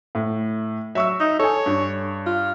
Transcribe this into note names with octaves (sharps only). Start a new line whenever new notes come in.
A2
F#3 E5 C#6 E6
D#4
A4 C#5 G#5
G2
F4